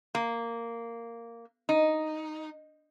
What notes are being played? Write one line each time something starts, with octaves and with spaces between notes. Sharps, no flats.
A#3
D#4